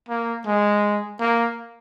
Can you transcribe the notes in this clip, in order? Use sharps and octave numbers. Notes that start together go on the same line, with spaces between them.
A#3
G#3
A#3